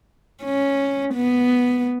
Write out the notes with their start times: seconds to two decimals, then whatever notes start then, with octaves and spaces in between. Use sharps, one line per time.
0.44 C#4
1.15 B3